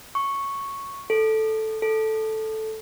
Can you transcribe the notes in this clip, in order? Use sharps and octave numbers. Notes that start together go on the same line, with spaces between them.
C#6
A4
A4